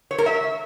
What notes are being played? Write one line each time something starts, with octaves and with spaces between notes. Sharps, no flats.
C#5
A#4
E5